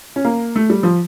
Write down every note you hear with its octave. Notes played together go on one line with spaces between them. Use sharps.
C#4
A#3
A3
G3
F3